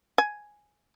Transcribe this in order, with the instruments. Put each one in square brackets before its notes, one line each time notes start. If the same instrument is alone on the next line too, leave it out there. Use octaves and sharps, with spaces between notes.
[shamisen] G#5